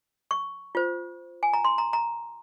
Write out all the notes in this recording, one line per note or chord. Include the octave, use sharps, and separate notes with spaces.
C#6
F4 C5
G#5
A#5
C6
A#5
A#5